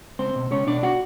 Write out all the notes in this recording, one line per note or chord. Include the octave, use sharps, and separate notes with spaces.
C#2 C4 C5
B2
C#2 C#4 C#5
B2 D4 D5
F#4 F#5